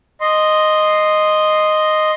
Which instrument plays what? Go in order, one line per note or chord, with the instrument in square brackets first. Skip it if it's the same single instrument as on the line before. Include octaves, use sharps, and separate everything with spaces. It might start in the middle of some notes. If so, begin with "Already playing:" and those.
[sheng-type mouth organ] D#5 C6